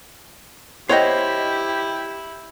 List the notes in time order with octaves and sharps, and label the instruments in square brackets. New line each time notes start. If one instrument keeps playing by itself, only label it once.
[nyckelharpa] E4 [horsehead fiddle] G4 [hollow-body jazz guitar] C5 F#5 G5 [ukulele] C#5 D#5